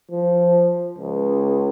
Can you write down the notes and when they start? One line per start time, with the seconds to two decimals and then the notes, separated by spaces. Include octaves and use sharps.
0.11 F3
0.99 C#2